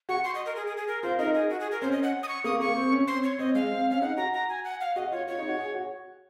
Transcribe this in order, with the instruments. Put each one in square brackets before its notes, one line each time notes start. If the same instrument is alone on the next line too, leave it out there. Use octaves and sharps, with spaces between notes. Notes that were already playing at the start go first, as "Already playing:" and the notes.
[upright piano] F#4 [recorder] C#6
[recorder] C6
D#5
A#4
G#4
G#4
G#4
A#4
[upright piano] F4 [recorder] C5
[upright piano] D#4 [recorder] A#4
[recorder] G#4
F#4
G#4
A#4
[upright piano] C#4 [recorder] C5
[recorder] D#5
F#5
D#6
C#6
[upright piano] A#3 [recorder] D#6
[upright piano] A#3 [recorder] C#6
[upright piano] C4
C#4
[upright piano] C4 [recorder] C6
[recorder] C#5
[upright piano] C4 [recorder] D#5
[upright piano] G#3 [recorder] F5
[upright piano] C4
C4
[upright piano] C#4 [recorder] F5
[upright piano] D#4 [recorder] F#5
[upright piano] F#4 [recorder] A#5
[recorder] A#5
G#5
F#5
F5
[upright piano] F#4 [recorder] D#5
[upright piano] F4 [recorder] C#5
[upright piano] F4 [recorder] C#5
[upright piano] D#4
F#4
G#4
F#4